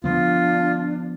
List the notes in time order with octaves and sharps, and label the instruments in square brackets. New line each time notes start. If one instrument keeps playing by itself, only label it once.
[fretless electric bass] D3 F3 B3 [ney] D4 [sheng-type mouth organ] F4